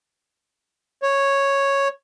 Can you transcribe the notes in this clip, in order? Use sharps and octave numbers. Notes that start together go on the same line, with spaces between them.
C#5